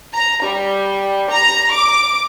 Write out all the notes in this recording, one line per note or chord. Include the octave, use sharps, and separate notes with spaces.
A#5
G3
A#5
D6